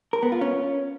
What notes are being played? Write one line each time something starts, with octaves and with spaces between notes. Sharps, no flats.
A#4
B3
F4
C#4